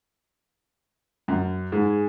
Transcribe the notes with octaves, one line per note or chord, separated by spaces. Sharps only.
F#2
G#2 G#4